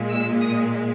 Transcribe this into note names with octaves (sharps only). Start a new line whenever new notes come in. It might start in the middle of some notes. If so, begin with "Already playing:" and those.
Already playing: A#2 G#3
E6
D#6